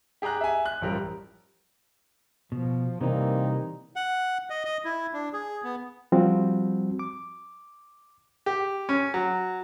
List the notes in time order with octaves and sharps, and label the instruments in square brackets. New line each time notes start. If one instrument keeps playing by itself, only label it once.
[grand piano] G4 G#4 G5 A#5 F#6
E5 G#5
F#6
A1 F3 G3 A#4
[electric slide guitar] B2 [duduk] F3
[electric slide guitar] C3 E3 [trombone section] G3 A#3 C4 [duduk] D#4
[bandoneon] F#5
D#5
D#5
E4
D4
G#4
B3
[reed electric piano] F3 G3 C4 F#4
D6
[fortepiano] G4
C#4
F#3